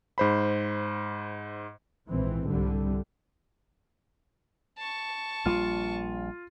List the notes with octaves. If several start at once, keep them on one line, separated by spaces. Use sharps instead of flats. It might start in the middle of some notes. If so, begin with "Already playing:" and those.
G#2 C5 B5
A#1 G#2 E3 C4
C2 D3 G3
A5 C#6
A#1 G3 A#3 F4